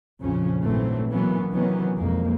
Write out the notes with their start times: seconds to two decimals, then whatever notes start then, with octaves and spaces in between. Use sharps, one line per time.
0.22 A#1 F2 C#3 F3 C#4
0.62 A#1 G#2 E3 F#3 A3 C4
1.11 B2 E3 F#3 A#3 B3 C#4
1.52 C3 D#3 E3 F#3 B3 C#4
1.94 B1 F2 G#3 A#3